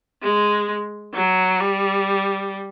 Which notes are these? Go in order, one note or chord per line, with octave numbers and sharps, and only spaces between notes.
G#3
F#3
G3